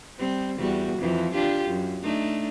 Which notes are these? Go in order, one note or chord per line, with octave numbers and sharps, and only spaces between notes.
G3 C4
E2 G3 F#4
F2 E3 F3
D4 F4 G4
F#2
A3 D4 D#4